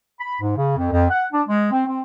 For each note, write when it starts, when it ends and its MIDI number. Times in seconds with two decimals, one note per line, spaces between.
0.20 0.36 83
0.41 0.54 44
0.56 0.73 49
0.76 0.91 41
0.91 1.05 41
1.10 1.25 78
1.33 1.42 62
1.47 1.69 56
1.71 1.83 60
1.86 2.01 60